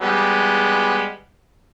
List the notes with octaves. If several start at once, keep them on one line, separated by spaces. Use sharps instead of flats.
G3 G#3 B3